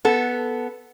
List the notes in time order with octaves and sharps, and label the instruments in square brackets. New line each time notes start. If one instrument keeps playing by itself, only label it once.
[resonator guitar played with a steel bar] B3 A4